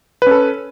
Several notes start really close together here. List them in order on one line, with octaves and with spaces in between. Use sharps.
B4 C#4 A4